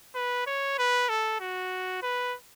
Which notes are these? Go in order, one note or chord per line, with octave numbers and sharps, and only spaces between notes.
B4
C#5
B4
A4
F#4
B4